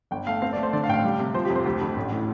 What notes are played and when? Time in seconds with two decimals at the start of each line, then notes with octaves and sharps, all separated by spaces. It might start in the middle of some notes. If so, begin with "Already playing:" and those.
0.11 G1 G5
0.27 A3 F5
0.42 C4 F5
0.53 D5
0.57 A3
0.63 C5
0.73 D3 D5
0.84 F5
0.88 A1 G5
0.94 F5
1.04 G3
1.19 C3
1.34 F3 C5
1.45 G4
1.50 F2
1.55 C5
1.65 D2 G4
1.81 D2
1.97 A1
2.12 A2